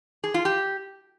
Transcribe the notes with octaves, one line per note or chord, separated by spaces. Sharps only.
G#4
F4
G4